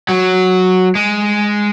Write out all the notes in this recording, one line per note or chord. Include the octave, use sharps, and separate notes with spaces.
F#3
G#3